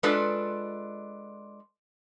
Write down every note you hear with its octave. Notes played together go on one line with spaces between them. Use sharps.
G#3 D4 F4 A4 B4 D5